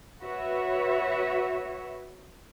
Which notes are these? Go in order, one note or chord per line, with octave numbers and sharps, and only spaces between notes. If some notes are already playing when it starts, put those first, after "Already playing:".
F#4 B4 C#5 E5